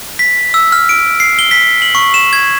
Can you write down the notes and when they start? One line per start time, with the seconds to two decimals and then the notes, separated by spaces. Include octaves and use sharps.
0.19 B6
0.54 E6
0.72 F6
0.89 D7
1.20 C7
1.39 G7
1.51 B6
1.82 F#7
1.95 C#6
2.14 E7
2.33 G#6